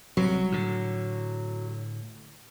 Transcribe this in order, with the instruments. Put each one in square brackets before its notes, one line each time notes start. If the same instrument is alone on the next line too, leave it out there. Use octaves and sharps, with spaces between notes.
[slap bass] C2 [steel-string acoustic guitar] F#3
[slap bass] A2 D3